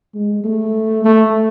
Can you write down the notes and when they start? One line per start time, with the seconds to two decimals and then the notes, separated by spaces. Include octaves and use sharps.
0.15 G#3
0.44 A3
1.04 A3